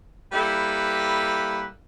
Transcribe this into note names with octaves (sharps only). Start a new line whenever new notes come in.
G3 A#3 E4 A4 B4